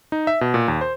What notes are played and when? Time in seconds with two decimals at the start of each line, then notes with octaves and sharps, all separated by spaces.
0.12 D#4
0.27 E5
0.41 B2
0.54 A#2
0.68 D#2
0.81 C5